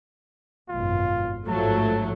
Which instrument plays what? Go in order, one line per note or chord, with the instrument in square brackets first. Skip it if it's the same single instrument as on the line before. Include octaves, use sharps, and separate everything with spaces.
[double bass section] G#1 F#2 B2 [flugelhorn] F4
[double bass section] A1 G#2 F3 [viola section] F#3 A3 [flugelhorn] A5